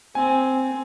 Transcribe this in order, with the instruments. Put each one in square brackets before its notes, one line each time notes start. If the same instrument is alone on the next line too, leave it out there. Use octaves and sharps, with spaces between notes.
[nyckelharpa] C4 [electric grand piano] G#5